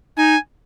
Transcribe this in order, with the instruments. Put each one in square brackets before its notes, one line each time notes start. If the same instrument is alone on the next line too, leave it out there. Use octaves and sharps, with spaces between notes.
[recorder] D#4 [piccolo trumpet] G#5